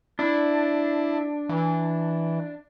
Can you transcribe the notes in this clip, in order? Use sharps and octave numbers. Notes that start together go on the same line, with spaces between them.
D4 E4
E3